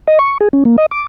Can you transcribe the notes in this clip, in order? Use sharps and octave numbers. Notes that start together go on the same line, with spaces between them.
D#5
C#6
G#4
C#4
A#3
D#5
D6